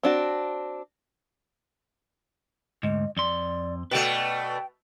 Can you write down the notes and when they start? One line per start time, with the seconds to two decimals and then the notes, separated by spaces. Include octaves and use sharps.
0.03 C4 D4 F#4
2.83 D2 G#2 D#5
3.17 F2 D5 C6
3.91 B2 A3 B4 D5 F#5 G5